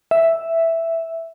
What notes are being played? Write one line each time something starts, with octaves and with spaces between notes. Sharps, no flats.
E5